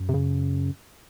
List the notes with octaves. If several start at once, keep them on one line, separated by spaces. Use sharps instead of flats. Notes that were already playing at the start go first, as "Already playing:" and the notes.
Already playing: F#2
C3
C#3